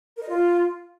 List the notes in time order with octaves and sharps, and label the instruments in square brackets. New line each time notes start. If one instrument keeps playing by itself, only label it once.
[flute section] A#4
D#5
F4